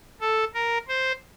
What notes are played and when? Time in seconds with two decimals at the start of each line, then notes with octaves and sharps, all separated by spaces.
0.21 A4
0.54 A#4
0.88 C5